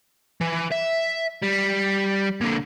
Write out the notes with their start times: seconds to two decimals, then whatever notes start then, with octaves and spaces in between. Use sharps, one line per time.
0.41 E3
0.72 E5
1.43 G3
2.41 A#2 D3